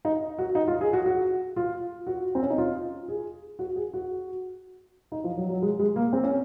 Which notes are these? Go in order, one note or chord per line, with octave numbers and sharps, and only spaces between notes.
D#4
F#4
D#4
F4
G#4
F#4
F#4
F4
F#4
C4
C#4
D#4
F4
G#4
F#4
G#4
F#4
D#4
F3
F#3
F#3
G#3
G#3
A#3
C4
C#4